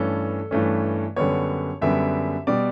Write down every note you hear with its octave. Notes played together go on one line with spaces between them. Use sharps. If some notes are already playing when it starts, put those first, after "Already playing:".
Already playing: G2 E3 A3 C#4 A4
G2 E3 A3 C#4
F#2 D3 G3 B3 C#5
F#2 D3 G3 B3 E5
B2 G3 B3 D5